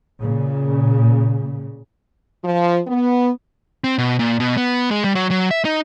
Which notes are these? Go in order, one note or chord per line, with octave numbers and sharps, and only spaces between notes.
A#2 C#3
F3
B3
C4
B2
A#2
B2
B3
G#3
G3
F#3
F#3
E5
D#4